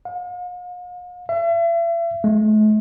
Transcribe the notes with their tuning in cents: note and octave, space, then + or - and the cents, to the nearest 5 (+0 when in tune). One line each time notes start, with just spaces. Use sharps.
F5 +45
E5 +40
A3 -45